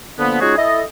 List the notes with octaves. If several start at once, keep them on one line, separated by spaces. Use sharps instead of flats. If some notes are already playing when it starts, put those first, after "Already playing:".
D3 F3 A#3 B3
G#3 C#4 D#4 F4 F#4 G#4
E4 A4 D#5